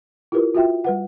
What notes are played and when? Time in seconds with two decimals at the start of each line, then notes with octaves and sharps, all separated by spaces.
0.32 E4 F4 G4 A#4 B4
0.55 F4 F#4 E5 G5
0.84 G3 B4 F#5